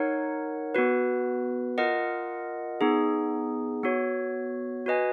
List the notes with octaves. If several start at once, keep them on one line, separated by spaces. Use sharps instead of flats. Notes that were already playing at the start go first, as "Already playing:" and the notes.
Already playing: D#4 A#4 C#5 F#5
B3 F#4 B4
F4 A#4 D#5 F#5
B3 D#4 G#4
B3 F#4 C#5
F#4 B4 D#5 G#5